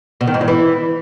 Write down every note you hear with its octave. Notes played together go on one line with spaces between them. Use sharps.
B2
D#3
G#2
E2
E3